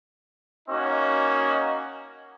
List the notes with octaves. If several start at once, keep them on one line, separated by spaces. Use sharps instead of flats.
A#3 C#4 D#4 F#4